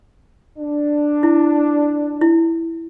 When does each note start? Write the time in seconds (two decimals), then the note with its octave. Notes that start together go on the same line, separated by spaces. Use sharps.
0.58 D4
1.23 E4
2.21 E4